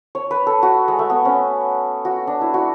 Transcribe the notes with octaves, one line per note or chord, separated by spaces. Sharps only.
C#5
B4
A4
F#4
G#3
A3
B3
C#4
F#4
D4
E4
F#4